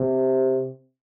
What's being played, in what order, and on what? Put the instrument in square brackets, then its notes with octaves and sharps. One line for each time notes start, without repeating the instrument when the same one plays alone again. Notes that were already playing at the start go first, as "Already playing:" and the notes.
Already playing: [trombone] C3